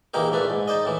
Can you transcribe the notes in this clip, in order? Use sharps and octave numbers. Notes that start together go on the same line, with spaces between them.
A#1 E3 A#3 D#4 G4 A#4
A#1 A#2 A3 D4 B4
G#2
D#4 C5 D5 D#5
A2 E3